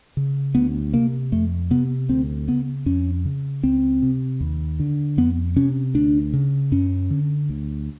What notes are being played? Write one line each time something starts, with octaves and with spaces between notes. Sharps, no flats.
C#3
D2 B3
C3 A#3
F2 A3
C3 B3
D2 C4
C#3 B3
F2 C#4
C#3
C#2 C4
C3
D#2
D3
F2 B3
C3 C#4
D2 D4
C#3
F#2 C#4
D3
D2